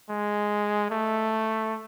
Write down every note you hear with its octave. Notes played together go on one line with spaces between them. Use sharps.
G#3
A3